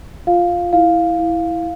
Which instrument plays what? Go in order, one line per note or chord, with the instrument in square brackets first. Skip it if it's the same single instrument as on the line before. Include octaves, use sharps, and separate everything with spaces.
[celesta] F4 F5
E4 F5
E4